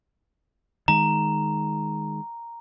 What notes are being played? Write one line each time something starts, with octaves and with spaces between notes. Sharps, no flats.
D#3 G#3 A#5